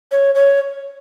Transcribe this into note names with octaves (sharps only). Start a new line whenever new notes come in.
C#5
C#5